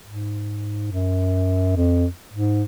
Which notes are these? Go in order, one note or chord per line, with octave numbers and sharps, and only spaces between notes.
G#2
F#2
F2
G#2